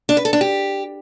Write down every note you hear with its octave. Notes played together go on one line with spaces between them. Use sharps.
D4
B4
A4
D4
G4